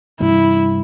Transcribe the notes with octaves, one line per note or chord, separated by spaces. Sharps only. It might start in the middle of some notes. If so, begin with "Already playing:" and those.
G2 C3 E3 E4